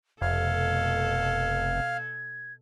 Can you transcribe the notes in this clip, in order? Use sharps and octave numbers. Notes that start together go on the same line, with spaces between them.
F1 B2 A4 F5 G#6